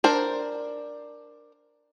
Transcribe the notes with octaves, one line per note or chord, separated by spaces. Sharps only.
D4 A#4 C5